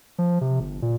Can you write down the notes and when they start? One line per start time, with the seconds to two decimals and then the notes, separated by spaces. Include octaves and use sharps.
0.18 F3
0.41 C3
0.60 G1
0.82 A#2